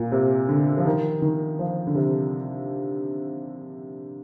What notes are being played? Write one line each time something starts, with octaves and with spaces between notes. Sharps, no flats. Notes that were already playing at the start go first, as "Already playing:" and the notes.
Already playing: A#2
C3
D3
F3
D#3
D#3
F3
D3
C3